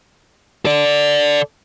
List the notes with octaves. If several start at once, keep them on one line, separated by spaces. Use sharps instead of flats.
A4 D5